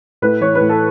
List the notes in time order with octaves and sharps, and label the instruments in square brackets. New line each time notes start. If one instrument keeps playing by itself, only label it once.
[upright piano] A2 B4
E3 C#5
B4
A2
A4